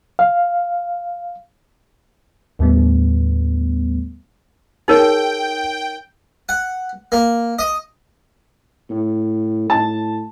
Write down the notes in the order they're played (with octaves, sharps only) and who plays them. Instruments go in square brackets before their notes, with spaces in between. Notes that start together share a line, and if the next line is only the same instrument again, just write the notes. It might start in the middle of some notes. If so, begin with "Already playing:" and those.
[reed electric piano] F5
[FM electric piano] D#2 A2 D3 G3 A3 B3
[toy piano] D#4 A#4 C#5 [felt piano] G#4 [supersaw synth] G5
[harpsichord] F#5
A#3
D#5
[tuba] A2
[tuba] A2 [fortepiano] A5